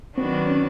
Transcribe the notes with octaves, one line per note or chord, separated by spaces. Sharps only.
D#3 F#3 B3 C4 D4 F#4
C#4